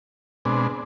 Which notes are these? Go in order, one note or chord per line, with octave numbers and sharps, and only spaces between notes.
B2 G#3 C4 D4